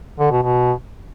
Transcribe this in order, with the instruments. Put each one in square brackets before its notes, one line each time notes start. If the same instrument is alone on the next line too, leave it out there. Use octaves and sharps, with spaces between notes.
[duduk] D3
B2
B2